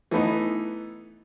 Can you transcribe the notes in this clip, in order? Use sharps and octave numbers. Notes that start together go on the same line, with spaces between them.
E3 A3 B3 D#4